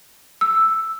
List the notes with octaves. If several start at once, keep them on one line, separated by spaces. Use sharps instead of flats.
E6